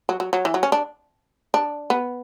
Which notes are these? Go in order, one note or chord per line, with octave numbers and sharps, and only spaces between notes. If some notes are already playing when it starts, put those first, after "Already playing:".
F#3
F#3
F#3
E3
F#3
C#4
D4
D4
B3